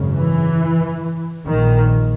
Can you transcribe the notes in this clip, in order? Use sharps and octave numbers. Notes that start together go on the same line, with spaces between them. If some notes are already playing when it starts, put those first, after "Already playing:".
Already playing: G#1 F#2 C#3
E3
A#1 A#2 D#3